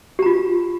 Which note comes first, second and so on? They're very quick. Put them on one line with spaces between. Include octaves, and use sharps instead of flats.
G4 A#5 F4